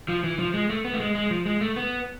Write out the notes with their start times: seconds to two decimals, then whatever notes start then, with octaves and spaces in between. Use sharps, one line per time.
0.08 F3
0.24 E3
0.39 F3
0.54 G#3
0.70 A3
0.85 B3
0.94 A3
1.00 G#3
1.15 G#3
1.31 F3
1.45 G#3
1.61 A3
1.76 B3